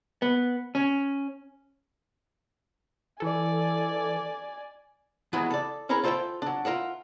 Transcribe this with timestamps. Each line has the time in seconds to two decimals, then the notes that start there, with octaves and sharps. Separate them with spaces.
0.22 B3
0.75 C#4
3.20 E3 A4 D5 G#5
5.33 E3 F#3 G#3 B3 E4
5.51 A4 D5
5.89 C#4 E4 G#4 A#4 B4 C#5
6.04 F4 A4 C5 D#5 E5 G5
6.42 F#3 D4
6.65 F4 A#4 E5 F#5